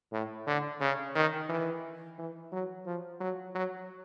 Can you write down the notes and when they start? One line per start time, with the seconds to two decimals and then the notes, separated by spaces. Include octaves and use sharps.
0.12 A2
0.47 D3
0.81 C#3
1.15 D#3
1.49 E3
2.19 E3
2.53 F#3
2.86 F3
3.20 F#3
3.55 F#3